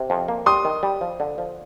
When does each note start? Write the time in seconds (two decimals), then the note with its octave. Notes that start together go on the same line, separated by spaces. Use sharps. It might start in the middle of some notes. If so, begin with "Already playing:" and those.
Already playing: C3
0.10 F2
0.28 A#3
0.46 G3 C6 D#6
0.65 D#3
0.83 G3
1.01 F3
1.20 D3
1.38 F3